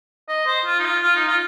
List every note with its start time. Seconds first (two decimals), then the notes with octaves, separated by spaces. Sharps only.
0.29 D#5
0.46 C5
0.65 F4
0.79 D#4
0.85 F4
1.03 F4
1.16 D#4
1.28 F4